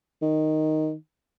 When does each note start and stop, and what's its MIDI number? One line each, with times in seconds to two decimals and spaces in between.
0.22 0.94 51